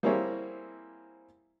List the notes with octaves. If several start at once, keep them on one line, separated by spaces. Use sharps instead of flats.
G3 A#3 C4 E4 G#4 C#5